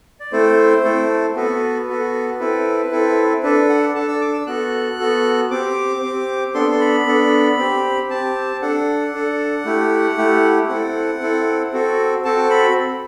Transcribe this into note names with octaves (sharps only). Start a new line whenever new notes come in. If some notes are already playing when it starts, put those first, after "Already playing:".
D5
A3 C4 E4 A4 C5
A3 C4 E4 A4
B3 F#4 A4 B4
B3 F#4 A4
C4 E4 A4
C4 E4 A4
D4 A4 B4
F#5
D4 A4 A5
E6
D6
E6
B3 F#4 A4 F#6
B3 F#4 A4
C4 G4 D6
C4 G4
B3 D4 A4 C6
C6
B5
B3 D4 A4
C4 G4
C4 G4 A5
D4 A4 F#5
D4 A4
A3 E4 G4
A3 E4 G4
C4 E4 A4 F#5
C4 E4 A4
C4 F#4 A4
C4 F#4 A4 A5
B5